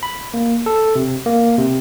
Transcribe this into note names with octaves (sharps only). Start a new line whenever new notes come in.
B5
A#3
A4
C3
A#3
C3